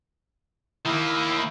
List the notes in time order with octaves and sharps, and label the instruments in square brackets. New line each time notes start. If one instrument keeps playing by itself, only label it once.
[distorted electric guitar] D#3 A#3 [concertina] E4